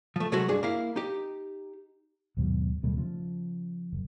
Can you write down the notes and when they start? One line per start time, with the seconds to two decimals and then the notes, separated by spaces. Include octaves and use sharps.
0.16 F3 A3
0.32 C3 F#3 G#3 A3 F#4
0.48 C#2 G2 D4 G#4
0.63 A#3 E4 F5
0.96 D#4 G4
2.37 D#2 G#2 B2 F#3
2.83 D#2 B2 G3 A3
2.97 C#3 F3
3.93 F#1